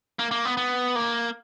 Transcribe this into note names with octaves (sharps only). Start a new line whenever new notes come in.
A#3
A#3
B3
B3
A#3